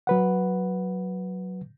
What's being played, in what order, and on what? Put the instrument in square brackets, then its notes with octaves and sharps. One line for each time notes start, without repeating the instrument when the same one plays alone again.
[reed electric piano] F#3 B4 F#5